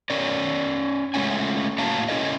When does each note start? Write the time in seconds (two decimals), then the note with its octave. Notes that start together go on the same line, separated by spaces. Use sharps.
0.10 C#4 A#4 C#5 D5
1.14 G#3 A3 C#4 F#5 G#5
1.78 A2 A#3 F#4 F5 A5 A#5
2.08 C#4 E4 G#4 A#4 D#5